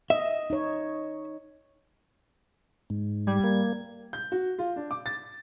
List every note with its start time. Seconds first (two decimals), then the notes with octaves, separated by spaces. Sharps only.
0.10 D#5 E5
0.50 D#4 C#5
2.90 G#2
3.27 G3 G#6
3.44 A#3
4.13 G6
4.32 F#4
4.59 F4
4.76 D4
4.91 D6
5.06 A6